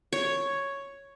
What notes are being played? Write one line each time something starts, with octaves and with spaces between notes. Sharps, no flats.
C#5